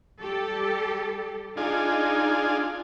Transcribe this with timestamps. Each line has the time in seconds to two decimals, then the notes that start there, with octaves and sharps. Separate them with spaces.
0.20 G3 G4 A4
1.57 D4 D#4 F4 G#4